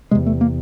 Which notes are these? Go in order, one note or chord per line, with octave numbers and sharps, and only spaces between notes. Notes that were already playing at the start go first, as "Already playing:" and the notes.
E2 C3 G#3
A3
A#3